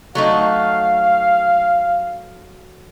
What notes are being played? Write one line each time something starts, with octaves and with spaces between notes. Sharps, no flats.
F#3 A3 D#4 F5